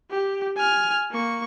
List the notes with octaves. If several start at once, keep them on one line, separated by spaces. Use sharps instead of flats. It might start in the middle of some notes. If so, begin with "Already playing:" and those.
G4
G#5 F6
A#3 C#6